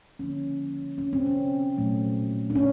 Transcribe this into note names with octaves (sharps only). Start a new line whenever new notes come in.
D3 F3 A#3 C#4
C#4
C4
C#4
A#2 F#3 A3
D4
C#4